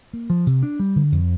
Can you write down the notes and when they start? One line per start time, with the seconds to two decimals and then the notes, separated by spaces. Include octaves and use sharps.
0.13 A#3
0.30 F3
0.47 C3
0.63 D4
0.80 G3
0.96 D3
1.12 F2